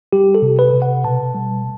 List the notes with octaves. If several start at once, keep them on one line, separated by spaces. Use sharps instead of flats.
G3 G4
A4
C3
B4
C3
F#5
B2 A5
G3